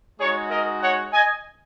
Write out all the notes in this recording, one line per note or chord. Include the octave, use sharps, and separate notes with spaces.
G#3 D#4 F#4 G#4 C#5
A#4 D#5
C#5 F#5
D#5 G#5